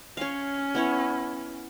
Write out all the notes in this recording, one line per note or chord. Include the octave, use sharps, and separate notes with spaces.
C#4 C#5 F5
B3 E4 C#5